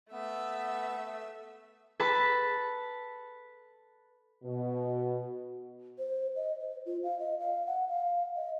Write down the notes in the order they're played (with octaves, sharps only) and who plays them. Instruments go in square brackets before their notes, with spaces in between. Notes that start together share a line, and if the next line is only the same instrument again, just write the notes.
[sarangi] A3 [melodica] B3 [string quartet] E5
[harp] A4 B4 A5 B5
[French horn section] B2
[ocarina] C5
D#5
C5
F4
F5
D#5
F5
F#5
F5
D#5